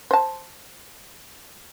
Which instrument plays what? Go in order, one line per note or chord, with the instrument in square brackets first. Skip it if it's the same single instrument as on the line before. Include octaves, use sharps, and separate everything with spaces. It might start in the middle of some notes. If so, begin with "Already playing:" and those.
[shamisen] C5 A5